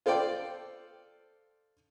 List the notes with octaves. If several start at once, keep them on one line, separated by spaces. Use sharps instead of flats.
F4 A4 C5 D5 G5